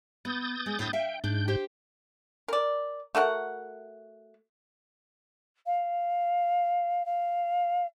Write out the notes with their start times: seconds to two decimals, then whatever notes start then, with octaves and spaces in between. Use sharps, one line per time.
0.25 B3 D#6 G6 A6
0.66 G#3
0.79 D2 A2
0.93 E5 F5 G5
1.24 G#2 D4 G6
1.48 G4 C5
2.48 A#4 D5
3.15 A3 F#4 A#4 F#5
5.66 F5
7.05 F5